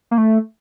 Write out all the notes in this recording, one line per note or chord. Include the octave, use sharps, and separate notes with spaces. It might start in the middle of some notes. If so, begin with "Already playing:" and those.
A#3
A3